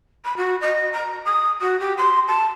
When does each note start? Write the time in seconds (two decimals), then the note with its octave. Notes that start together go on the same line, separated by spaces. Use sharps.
0.25 B5
0.37 F#4
0.61 D#5
0.92 A#5
1.25 D#6
1.61 F#4
1.79 G4
1.97 C6
2.28 A5